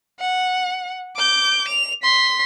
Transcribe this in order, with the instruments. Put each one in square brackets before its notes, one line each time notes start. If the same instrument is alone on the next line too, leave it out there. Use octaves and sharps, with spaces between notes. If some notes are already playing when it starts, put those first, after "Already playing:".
[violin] F#5
D6 G6
F7
C6 B6